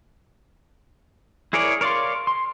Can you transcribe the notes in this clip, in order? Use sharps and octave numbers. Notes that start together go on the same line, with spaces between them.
E4 G#4 A#4 C#5 D5
A#4 C#5 D5 F5 C6
C6